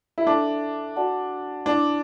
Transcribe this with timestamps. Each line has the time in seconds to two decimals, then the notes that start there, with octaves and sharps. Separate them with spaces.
0.18 E4
0.27 D4 A4 E5 A5 D6
0.96 F#4 D5 F#5 A5
1.66 D4 E4 D5 A5 D6